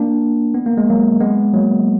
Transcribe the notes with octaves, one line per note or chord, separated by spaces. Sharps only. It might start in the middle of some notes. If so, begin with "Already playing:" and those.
Already playing: A#3 D4
B3
A#3
G#3
F#3 A#3
G#3 B3
F#3 A#3